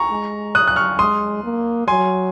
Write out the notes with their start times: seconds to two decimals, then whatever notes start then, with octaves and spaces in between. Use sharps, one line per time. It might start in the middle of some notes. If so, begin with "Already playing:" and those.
Already playing: A#5 C#6
0.11 G#3
0.55 D#6 F#6
0.68 F#6
0.76 C#6 F6
0.99 G#3 C6 D#6
1.44 A#3
1.87 F#3 G#5 C6